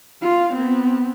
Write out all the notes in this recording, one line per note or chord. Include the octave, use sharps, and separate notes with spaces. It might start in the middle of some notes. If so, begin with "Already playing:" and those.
F4 F5
B3 C4